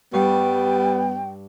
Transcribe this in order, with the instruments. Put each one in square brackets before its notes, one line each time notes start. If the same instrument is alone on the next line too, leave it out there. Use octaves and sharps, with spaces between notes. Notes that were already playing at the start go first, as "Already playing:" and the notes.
[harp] G2 C#6 [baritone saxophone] G3 [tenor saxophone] B3 [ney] G5